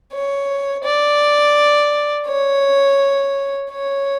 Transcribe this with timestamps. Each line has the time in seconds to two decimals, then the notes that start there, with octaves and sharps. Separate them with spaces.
0.13 C#5
0.84 D5
2.27 C#5
3.71 C#5